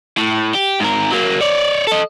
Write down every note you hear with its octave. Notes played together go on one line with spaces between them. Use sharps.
A2
G4
G#2 A#4
F#3 A#3
C#5 D5
A4 D#5